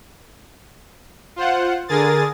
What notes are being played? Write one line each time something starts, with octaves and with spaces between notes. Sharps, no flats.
F4 C5 F#5
D3 G#4 A#4 G#5 D#6 A6